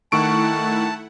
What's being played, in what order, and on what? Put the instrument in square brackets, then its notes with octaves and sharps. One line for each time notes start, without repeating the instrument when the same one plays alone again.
[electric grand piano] D#3 C#6 D7 [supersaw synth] A3 E4 F#5 [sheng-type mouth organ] A5